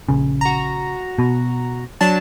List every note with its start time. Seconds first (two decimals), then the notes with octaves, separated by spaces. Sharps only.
0.09 A#1 C#3
0.41 F#4 A#5
1.19 B2
2.01 F#3 D4 A5